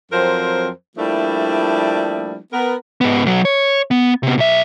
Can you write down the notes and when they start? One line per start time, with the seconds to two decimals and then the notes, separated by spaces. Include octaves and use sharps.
0.11 F2 F3 F#3 C4 A#4 C5
0.98 F3 G3 A3 A#3 D4 E4
2.53 B3 A#4
3.01 G#2 B3
3.25 B1 F#3
3.45 C#5
3.91 B3
4.23 C3 B3
4.38 B1 E5